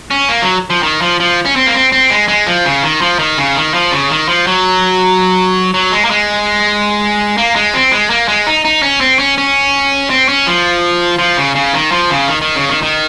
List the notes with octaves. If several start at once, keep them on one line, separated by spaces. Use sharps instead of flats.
C#4
A#3
F#3
F3
D#3
F3
F3
C#4
C4
A#3
C4
C4
G#3
G#3
F3
C#3
D#3
F3
D#3
C#3
D#3
F3
C#3
D#3
F3
F#3
F#3
G#3
A#3
G#3
A#3
G#3
C4
G#3
A#3
G#3
D#4
D#4
C#4
C4
C#4
C#4
C4
C#4
F3
F3
C#3
C#3
D#3
F3
C#3
D#3
D#3
C#3
D#3
D#3